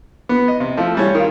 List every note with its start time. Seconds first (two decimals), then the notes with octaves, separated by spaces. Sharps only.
0.29 B3
0.48 D#5
0.60 C3
0.77 F3 A3
0.95 E3 G3 C#5
1.15 D#3 F4